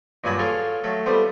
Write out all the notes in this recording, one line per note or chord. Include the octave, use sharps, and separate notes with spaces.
G2 A#2 F#3 G#5 A5 B5
F4 G#4 A4 C#5 F5 G5
F#3 A3 A4
G3 A3 B3 F4 C5